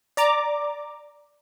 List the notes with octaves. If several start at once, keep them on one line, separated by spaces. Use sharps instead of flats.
D5 A#5 D6